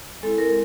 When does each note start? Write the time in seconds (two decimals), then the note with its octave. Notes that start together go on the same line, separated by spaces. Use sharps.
0.23 G#3 C4 E4 A4
0.38 A#4